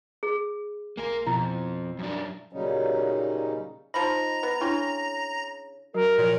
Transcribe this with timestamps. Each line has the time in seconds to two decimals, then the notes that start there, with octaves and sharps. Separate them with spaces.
0.23 G#4
0.97 B1 A#3 A#4 G#5 C6
1.27 F2 B2 E4
1.99 F#2 D4 E5 A#5
2.53 A#2 C#3 F#3 G3 C#4 D#4
3.94 F3 D#4 A#5 B5 A#6
4.43 B3
4.61 C#3 D4 E4 G5 C6
5.94 F#3 F#4 A#4
6.18 A#2 F3 F#3 C#5